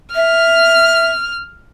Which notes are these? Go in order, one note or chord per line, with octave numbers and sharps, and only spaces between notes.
E5 F6